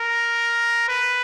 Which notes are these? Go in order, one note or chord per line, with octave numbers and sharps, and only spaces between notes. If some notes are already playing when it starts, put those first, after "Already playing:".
Already playing: A#4
B4